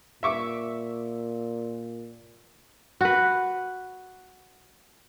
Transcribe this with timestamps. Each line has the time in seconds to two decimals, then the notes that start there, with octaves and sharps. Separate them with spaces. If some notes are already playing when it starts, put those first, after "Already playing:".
0.23 A#2 E5 C#6 D6
3.01 F#4 B4